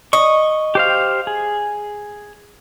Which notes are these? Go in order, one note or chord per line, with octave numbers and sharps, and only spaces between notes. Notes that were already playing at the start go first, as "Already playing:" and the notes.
D#5 C#6
G4 C5 F5
G#4